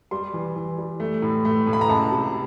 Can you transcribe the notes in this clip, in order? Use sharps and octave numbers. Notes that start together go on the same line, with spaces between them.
G3 C6
E3
E3
G3
A3
A2
A3
A2
B5
A#5
C#2 A5
C3